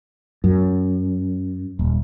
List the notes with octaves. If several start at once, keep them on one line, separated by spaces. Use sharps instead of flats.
F#2
D#1